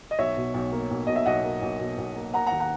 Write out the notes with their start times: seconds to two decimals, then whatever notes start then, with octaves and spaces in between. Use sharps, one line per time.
0.11 D#5
0.18 B1 C#5 E5
0.37 B2
0.54 B1
0.72 A#3
0.91 B1
1.07 B2 D#5
1.16 E5
1.26 B1 D#5 F#5
1.44 A#3
1.62 B1
1.80 B2
1.98 B1
2.16 A#3
2.33 A#3 F#5 A#5
2.47 F#5 A#5
2.51 D#2
2.60 F#5 A#5